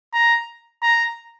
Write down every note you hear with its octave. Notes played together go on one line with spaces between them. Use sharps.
A#5
A#5